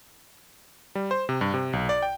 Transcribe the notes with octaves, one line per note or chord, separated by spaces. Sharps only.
G3
C5
C3
G2
C3
B1
D5
G5